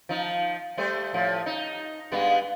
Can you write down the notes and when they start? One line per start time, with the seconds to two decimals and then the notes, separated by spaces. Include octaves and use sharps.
0.09 F3 D#4
0.77 G3 A3 C5
1.14 A2 F3
1.46 D#4
2.12 G2 G#3 B3